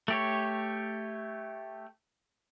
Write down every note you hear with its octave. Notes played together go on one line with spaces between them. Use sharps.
A3 G4 C#5